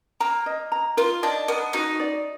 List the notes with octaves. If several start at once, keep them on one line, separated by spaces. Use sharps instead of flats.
A#3 A#5
D#5
A#5
F4 A#4
D4 D#5
B3 A#4
D#4 F#4
D5